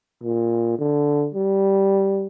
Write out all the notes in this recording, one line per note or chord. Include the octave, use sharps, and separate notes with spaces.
A#2
D3
G3